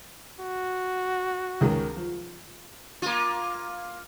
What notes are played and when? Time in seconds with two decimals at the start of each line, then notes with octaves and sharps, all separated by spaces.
0.40 F#4
1.61 C#2 D#3 G#3
1.96 F3
3.02 A#3 F4